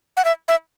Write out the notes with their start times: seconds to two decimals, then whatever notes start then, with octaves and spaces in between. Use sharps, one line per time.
0.17 F#5
0.25 E5
0.48 E5